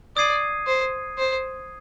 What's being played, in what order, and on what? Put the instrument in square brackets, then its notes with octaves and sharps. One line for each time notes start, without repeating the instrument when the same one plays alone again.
[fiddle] D5 [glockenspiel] D#6 G#6 C7 D#7
[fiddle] C5
C5